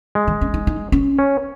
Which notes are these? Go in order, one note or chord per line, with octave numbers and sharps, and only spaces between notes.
G#3
D#3
C#4
D#4
D#4
C#4
C#4